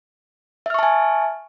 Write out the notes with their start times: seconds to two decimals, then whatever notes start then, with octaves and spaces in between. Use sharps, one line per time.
0.66 E5
0.70 F6
0.74 C#6
0.79 A5
0.83 G#5